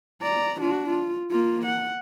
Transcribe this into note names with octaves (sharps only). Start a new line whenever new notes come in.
D5 A#5
D4 F#4
F4
A#3 F4
F#5